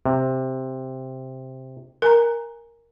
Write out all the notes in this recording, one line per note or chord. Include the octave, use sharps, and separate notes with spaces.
C3
A#4 G#5 A#5